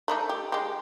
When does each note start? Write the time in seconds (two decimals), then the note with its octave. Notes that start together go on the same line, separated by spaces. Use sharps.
0.08 A3 D4 D#4
0.29 G4
0.52 G#3 G4